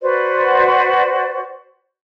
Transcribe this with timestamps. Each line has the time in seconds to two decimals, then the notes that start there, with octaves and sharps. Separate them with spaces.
0.01 F#4 B4 C5 D5